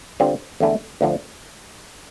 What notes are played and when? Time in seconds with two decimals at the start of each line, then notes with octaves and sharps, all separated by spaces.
0.20 D3 G3 C4 F4
0.60 E2 D3 A3 E4
1.01 D2 D3 F3